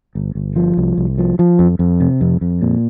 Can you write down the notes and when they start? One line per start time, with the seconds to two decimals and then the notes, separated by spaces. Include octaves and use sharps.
0.15 G1
0.35 G1
0.56 F3
0.77 C2
0.98 C2
1.18 F3
1.39 F3
1.59 F2
1.79 F2
2.00 C3
2.21 F2
2.41 F2
2.62 A#2